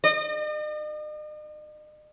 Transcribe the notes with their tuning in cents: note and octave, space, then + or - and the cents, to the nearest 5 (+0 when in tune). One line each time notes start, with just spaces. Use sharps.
D#5 -45